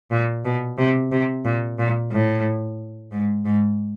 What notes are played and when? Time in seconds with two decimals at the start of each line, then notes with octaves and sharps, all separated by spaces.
0.11 A#2
0.45 B2
0.78 C3
1.12 C3
1.45 A#2
1.79 A#2
2.12 A2
3.12 G#2
3.45 G#2